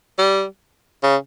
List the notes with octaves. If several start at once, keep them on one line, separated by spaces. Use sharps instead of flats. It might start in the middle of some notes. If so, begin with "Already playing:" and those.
G3
C#3